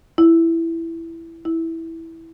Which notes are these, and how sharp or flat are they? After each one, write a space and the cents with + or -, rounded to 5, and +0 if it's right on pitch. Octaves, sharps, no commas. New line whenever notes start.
E4 +5
E4 -10